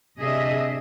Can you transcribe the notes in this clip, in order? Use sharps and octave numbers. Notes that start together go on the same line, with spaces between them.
C3 D4 G#4 D#5 E5